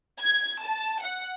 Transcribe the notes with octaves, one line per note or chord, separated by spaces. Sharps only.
G#6
A5
F#5